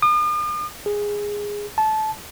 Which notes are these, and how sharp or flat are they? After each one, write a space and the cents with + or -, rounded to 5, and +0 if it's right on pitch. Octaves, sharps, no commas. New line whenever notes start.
D#6 -45
G#4 -10
A5 -20